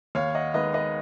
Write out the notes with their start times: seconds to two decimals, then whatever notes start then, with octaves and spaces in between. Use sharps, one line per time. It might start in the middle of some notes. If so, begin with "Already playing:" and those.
0.15 D#2 C#5 F5
0.35 D#5 F#5
0.54 D#3 G#3 B3 B4 D#5
0.74 B4 D#5